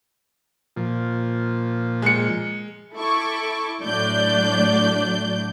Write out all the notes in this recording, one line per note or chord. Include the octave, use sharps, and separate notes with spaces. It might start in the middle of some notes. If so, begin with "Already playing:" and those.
A#2 F3
G#3 C#7
E4 A4 C#6 D6
A2 F#3 D4 D5 G6